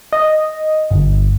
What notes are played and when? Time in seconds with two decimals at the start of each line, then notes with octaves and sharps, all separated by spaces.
0.13 D#5
0.91 G1